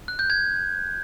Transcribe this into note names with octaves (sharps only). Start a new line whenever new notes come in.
F#6
G6
G#6